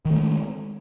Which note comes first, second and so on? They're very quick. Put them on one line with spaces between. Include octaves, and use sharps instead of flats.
D#3 A3 G#3